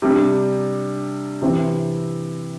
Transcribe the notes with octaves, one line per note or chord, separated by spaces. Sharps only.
C3 G3 D4
C3 E3 C4